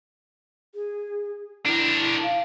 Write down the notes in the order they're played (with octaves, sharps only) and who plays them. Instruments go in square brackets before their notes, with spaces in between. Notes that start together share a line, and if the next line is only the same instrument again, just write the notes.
[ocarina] G#4
[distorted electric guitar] D4 A#4 [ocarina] E4
[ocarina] F5